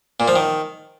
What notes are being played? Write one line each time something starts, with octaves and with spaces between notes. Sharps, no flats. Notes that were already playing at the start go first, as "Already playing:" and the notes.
A#2
F3
D#3